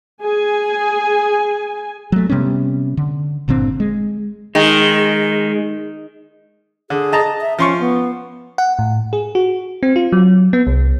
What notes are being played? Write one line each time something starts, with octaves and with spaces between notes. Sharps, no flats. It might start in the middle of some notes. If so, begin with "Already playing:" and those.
G#4 G#5
F#3 A3
C3 G3 B3 C#4
D3
G1 A#2 D3 C4
G#3
D#3 G#3
D3 G#4
D#5 A5 A#5
E5
F3 C#4 C6 C#6
B3
F#5
A2
G#4
F#4
C4
F4
F#3
B3
C2